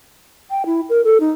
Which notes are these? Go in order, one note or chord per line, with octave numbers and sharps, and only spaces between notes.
G5
E4
A#4
A4
D#4